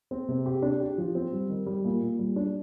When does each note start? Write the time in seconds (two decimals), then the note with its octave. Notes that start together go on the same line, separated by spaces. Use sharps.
0.11 C4
0.28 C3
0.46 G4
0.62 D4
0.80 G4
0.98 F3
1.15 C4
1.32 G3
1.49 D#3
1.66 G3
1.85 A#2
2.02 A#2
2.19 G3
2.36 D4